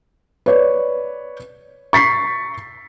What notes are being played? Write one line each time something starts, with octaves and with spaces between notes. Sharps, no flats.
B4 C#5 D5
C#6 A6 B6 C7